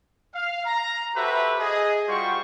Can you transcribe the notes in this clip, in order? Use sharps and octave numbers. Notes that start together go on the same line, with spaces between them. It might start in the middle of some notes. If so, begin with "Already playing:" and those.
F5
A#5
F#4 G4 A4 B4 C5 E5
G#4 D#5
G3 F4 F#4 C5 G5 C#6